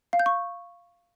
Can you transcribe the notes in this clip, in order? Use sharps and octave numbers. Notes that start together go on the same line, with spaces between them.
F5
G6
C#6